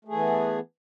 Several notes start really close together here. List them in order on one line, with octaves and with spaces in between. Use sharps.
A3 G#4 E3 B3